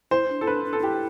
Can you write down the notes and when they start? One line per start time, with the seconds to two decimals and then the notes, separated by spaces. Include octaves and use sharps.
0.11 E4 C5
0.29 D4
0.41 E4 A4
0.47 D4 B4
0.65 D4
0.73 A4
0.79 D4
0.83 E4 G4